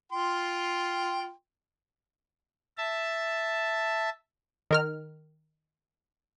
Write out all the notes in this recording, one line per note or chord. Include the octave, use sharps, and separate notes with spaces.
F4 G5 C6
E5 A5
D#3 A#4 F6